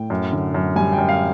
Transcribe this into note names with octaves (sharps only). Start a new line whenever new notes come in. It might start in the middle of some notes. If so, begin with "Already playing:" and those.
Already playing: A2 G5
F#2
D3
F#2
G3 G#5
G5
F#2
F5